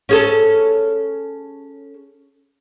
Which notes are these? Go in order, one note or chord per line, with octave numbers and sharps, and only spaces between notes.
C#4 G#4 A4